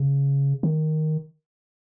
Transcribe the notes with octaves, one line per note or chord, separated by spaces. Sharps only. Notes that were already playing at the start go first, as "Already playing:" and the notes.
Already playing: C#3
D#3